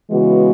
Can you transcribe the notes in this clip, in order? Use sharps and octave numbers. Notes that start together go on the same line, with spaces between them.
C#3 E3 G#3 B3 F#4